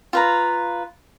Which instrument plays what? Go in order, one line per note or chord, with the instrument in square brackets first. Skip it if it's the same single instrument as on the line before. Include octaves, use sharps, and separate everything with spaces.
[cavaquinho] F4 B4 A#5